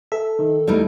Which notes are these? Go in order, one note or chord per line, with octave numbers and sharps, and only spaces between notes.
A4 E5
D#3
E2 G3 A3 D#4 E4 A#4